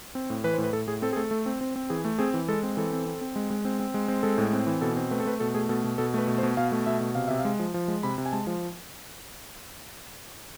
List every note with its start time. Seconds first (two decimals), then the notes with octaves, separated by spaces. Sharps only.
0.15 C4
0.30 A2
0.44 E3 B4
0.54 A2 C5
0.64 B4
0.73 A2 A4
0.88 A2 G#4
1.02 C4 A4
1.13 G#4
1.16 A3 A4
1.31 A3
1.46 C4
1.61 C4
1.76 C4
1.90 E3 G#4
2.05 A3
2.19 C4 G#4
2.34 E3
2.48 G#3 A4
2.63 C4
2.77 E3 A4
2.93 C4
3.06 C4
3.21 C4
3.36 G#3
3.51 G#3
3.65 C4
3.80 C4
3.94 G#3
4.08 C4
4.23 G#3 A4
4.38 A2
4.53 C4
4.67 E3
4.81 B2 A4
4.97 C4
5.11 A3 B4
5.20 A4
5.26 A3 B4
5.40 B2 A4
5.54 A3 G#4
5.69 B2 A4
5.84 B2
5.98 B2 A4
6.14 A3 B4
6.27 B2
6.38 C5
6.43 B2
6.57 B2 F5
6.72 A3
6.86 B2 E5
7.01 B2
7.15 C3 F5
7.28 C3 E5
7.39 F5
7.45 G#3
7.59 F3
7.74 F3
7.88 G#3
8.03 C3 B5
8.18 C3
8.26 G#5
8.32 G#3 A5
8.47 F3